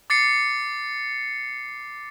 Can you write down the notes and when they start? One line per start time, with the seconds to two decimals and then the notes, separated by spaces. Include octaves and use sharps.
0.10 D6 A6 C7 C#7